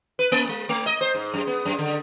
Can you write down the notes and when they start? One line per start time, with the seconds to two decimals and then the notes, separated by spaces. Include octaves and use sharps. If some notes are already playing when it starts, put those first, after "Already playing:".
0.19 B4
0.32 A#3
0.49 G#3
0.69 A3
0.86 D#5
1.01 C5
1.15 G#2
1.34 F#2
1.47 B3
1.65 F#2
1.78 D3